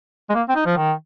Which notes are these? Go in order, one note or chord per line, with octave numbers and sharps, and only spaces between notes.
G#3
A#3
C4
D#4
F3
D#3